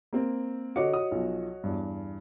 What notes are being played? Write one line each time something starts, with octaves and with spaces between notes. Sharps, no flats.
A#3 C4
D3 F#4 C#5 D#5 D6 C#7
D#6
B1 F3
E2 G2